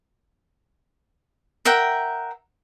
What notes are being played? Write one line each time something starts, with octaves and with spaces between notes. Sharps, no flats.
A#4 E5 F#5 G5